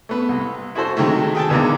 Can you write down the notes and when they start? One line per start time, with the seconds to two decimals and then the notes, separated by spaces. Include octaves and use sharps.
0.09 A3 B3
0.29 C2
0.75 E4 F#4 A4 C5
0.97 C3 D#3 F#3 G#3 A3
1.35 G#4 G5 A5
1.49 E2 D3 E3 G#3 A#3 D#4